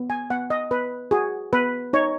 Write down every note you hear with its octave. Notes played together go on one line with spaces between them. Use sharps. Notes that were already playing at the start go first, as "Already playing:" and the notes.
Already playing: B3
G#5
B3 F#5
D#5
B3 B4
F#4 G#4
B3 B4
D#4 C#5